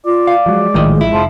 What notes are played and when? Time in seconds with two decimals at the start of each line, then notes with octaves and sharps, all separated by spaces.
0.06 F4 D5
0.27 F5
0.46 F3 F#3 G#3
0.74 A#1 A2 D#3 F3 D#5
1.01 E4
1.13 F1 F3